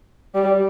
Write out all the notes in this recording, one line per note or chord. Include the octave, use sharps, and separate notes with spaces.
G3